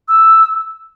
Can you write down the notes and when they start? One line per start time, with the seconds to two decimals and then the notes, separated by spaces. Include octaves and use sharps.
0.08 E6